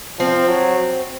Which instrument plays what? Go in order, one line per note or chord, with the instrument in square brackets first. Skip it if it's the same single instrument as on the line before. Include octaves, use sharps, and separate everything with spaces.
[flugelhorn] F3 [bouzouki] C4
[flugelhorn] F#3